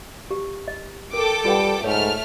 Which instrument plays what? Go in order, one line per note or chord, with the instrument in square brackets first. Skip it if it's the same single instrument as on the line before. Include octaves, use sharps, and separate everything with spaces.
[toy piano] G4
D#5
[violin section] A4 G5 D6 [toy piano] A#4
[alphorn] G3 [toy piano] F4 B4 F#5
[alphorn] G#2 [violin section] A3 F6 [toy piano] C#5